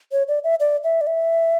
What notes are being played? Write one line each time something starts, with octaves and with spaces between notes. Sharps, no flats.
C#5
D5
E5
D5
E5
D5
E5